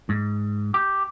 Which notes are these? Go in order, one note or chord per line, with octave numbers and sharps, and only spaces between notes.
G#2
G4